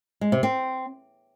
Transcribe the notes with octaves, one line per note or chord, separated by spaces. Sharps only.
G#3
C3
C4